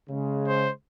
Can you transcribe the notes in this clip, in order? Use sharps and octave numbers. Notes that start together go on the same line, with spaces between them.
C#3 G#3
C5